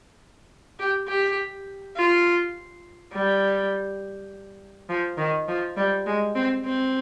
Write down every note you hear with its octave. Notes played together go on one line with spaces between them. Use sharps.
G4
G4
F4
G3
F3
D#3
F3
G3
G#3
C4
C4